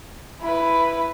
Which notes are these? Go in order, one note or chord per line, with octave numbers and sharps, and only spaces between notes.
E4 B4